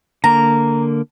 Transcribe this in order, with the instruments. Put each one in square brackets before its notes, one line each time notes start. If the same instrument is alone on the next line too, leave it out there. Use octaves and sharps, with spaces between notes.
[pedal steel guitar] D3 A#3 [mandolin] A#5